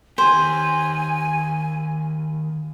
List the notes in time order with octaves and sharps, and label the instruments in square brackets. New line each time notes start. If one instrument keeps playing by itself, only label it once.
[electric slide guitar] D#3 G4 [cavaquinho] C5 [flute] G#5